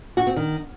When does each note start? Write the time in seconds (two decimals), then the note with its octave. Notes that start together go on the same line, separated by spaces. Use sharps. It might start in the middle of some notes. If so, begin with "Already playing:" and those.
0.17 F#4
0.27 C4
0.36 D#3